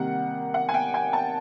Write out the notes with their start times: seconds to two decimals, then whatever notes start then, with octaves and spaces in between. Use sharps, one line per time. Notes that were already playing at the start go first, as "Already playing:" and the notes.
Already playing: C3 D#3 G3 A#3 F#5
0.54 F#5
0.69 G#5
0.74 G5
0.94 G#5
1.13 A5